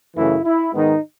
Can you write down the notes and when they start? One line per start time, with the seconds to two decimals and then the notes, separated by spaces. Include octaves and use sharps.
0.15 F#2 C#3 E3 A3 E4
0.44 E4
0.73 G#2 D#3 G#3 B3 D#4